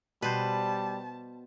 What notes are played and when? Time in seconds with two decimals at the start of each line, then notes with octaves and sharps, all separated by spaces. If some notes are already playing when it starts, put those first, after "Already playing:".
0.22 B2 G3 B4 C5 A5